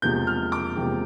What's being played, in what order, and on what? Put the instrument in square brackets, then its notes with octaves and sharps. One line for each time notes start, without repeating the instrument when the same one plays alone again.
[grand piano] E1 E2 C3 F3 A#3 G6
F6
D6
E1 E2 C3 F3 A#3 G5